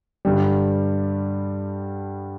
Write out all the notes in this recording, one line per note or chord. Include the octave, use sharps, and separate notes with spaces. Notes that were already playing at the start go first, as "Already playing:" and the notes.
G2 D3 G3